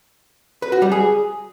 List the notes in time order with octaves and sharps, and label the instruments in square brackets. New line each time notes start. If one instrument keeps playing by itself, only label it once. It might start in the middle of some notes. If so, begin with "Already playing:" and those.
[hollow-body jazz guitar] B4
F#4
G3
G#4